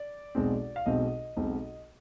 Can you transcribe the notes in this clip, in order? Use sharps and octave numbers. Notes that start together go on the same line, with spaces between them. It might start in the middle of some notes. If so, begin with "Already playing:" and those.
Already playing: D5
B1 B2 G#3 C4
F5
B1 B2 G#3 C4 D#5
B1 B2 G#3 C4